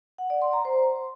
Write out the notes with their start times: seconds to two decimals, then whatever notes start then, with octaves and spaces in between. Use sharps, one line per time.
0.18 F#5
0.30 D5
0.42 C6
0.53 A#5
0.65 C5